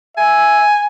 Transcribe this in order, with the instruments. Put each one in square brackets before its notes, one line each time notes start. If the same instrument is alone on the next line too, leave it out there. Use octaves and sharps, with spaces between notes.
[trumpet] E5 [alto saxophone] G#5